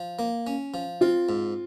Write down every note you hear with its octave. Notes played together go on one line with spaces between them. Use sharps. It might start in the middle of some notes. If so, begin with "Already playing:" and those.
Already playing: F3
A#3
C#4
F3
C4 F4
G#2